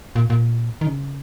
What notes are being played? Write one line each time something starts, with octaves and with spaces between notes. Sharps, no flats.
A#2
A#2
D#3
C#3